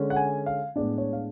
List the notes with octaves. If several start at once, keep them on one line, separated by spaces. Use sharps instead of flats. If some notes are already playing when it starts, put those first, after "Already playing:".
Already playing: D3 G#3 C#4
F#5
G#5
F5
A2 G#3 B3 D4 D5
C#5
F5